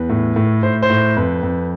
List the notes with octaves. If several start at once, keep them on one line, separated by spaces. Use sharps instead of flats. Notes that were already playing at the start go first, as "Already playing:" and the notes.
Already playing: E2 B4
A2
A2
A2 C5
C5
A2
F2 B4
F2